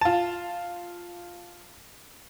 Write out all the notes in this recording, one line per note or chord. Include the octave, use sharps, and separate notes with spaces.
F4 A5